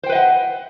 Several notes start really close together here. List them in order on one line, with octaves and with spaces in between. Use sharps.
C5 G5 B4 D#5 F#5